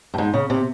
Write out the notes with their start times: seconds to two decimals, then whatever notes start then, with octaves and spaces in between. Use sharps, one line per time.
0.14 G2
0.18 G#2
0.34 C#3
0.50 C3